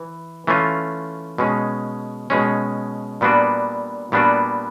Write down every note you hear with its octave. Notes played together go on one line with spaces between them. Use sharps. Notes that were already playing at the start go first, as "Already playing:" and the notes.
Already playing: E3
E3 A3 C#4 F4
B2 G#3 C#4
B2 G#3 C#4
A#2 G3 B3 D4 F#4
A#2 G3 B3 D4 F#4